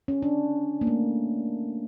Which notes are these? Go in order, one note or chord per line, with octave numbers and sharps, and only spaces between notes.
C#4
D4
A#3
A3